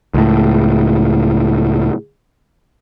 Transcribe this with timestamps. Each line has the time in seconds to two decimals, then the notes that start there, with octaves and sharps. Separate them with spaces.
0.14 C#2 A2